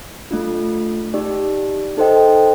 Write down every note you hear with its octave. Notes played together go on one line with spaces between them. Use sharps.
A3 D4 F4
D#4 G4 D5
D#4 A4 C5 D#5 G5